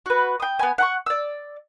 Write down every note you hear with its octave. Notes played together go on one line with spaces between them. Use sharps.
F#4 B4
G5 D#6
B3 G#5
F#5 A#5 C#6
D5 E6